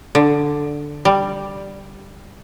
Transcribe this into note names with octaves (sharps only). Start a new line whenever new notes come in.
D3
G3